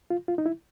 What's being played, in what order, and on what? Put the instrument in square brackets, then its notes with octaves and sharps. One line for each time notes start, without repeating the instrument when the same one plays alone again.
[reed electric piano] F4
F4
D#4
E4